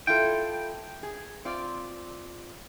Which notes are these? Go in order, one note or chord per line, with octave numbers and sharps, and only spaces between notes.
E4 F4 A4 G5
G#4
C4 F4 D5